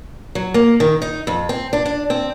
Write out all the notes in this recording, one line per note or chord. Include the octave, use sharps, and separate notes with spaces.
F#3
A#3
D#3
D#4
F2
C4
D4
D4
C4